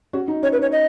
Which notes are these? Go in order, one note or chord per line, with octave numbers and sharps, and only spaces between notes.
C#4 F#4
D#4
C#4 C#5
B4
D#4 C#5
D#5